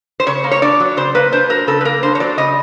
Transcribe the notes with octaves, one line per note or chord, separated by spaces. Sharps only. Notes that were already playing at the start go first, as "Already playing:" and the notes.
C5
C#3 C#5
A#3
C#5
D4 D5
F#3
C#3 C5
A#3 B4
D4 C5
F#3 A#4
C#3 A4
B4
A#3 A#4
D4 C5
C#5
F#3 D5
C#3 D#5